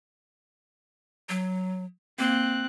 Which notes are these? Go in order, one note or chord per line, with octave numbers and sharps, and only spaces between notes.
F#3
A#3 C4 F#6